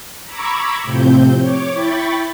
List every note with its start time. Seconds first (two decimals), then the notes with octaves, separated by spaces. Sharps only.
0.24 A#5 B5 C#6 D6 E6 G#6
0.84 A2 C3 F3 C4 G6
1.40 C#5 D6
1.73 E4 G5 B5 C#6 A6